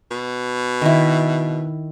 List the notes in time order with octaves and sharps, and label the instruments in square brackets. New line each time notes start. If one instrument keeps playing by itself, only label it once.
[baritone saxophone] B2
[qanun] D#3 E4